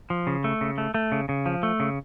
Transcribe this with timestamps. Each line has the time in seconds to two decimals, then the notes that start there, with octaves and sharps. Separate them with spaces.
0.10 F3
0.27 C#3
0.44 A3
0.61 C#3
0.78 A3
0.94 A3
1.12 C#3
1.29 C#3
1.46 F3
1.63 A3
1.80 C#3